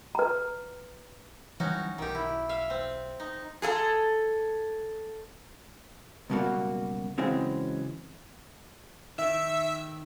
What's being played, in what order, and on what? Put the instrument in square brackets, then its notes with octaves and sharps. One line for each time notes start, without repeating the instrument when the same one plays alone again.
[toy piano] B4 A#5
[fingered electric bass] E3 F#3 G3 [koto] C#4 D#4 F#4
[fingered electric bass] B1 [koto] D#3 G4
[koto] E4
E5 F5
C4
D#4
[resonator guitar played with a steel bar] G#4 A4 E5 A#5
[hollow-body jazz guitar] C#2 F#2 B2 G3 A#3 F#4
C#3 E3 F#3 G#3 C4 C#4
[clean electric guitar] D#3 [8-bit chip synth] E5 E6